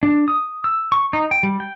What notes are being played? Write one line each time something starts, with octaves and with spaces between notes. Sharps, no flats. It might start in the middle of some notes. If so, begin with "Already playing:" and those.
D4
D#6
E6
C#6
D#4
G5
G3
G5